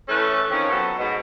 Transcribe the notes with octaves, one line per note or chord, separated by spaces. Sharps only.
E3 A3 C#4 A4 B4
D#3 F3 C4 C#4
F#3 B3 A4
G#2 B2